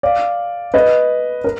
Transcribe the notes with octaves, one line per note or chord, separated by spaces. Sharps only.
D5 F5
B4 D#5
A#4